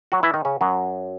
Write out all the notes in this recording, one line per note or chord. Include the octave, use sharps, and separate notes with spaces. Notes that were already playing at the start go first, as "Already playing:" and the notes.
F#3 F#4
E3 E4
D#3 D#4
C#3 C#4
F#2 F#3